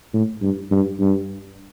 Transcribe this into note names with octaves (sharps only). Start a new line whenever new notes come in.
A2
G2
G2
G2